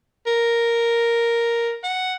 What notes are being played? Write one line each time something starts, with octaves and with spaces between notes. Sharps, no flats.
A#4
F#5